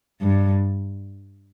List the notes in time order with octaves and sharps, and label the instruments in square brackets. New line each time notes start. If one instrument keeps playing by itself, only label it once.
[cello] G2